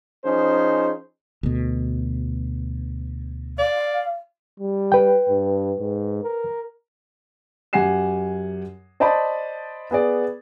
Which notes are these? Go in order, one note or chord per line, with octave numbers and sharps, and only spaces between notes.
F3 C#4 D#4 G#4 C5
D2 B2
D5 F5
G3
B4 G5
G2
G#2
A#4
F#2 G4 F#5 G#5 C7 E7
C5 D5 D#5 A5 B5
B3 G#4 D5